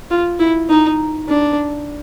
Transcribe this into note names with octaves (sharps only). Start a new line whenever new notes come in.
F4
E4
D#4
D4